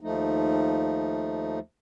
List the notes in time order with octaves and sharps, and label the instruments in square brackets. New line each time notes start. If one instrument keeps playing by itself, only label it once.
[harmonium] D#2 F3 A3 D#4